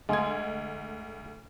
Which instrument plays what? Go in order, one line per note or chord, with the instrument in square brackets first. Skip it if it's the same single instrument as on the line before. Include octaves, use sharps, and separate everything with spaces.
[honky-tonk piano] D2 G#6 [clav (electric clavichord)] G#3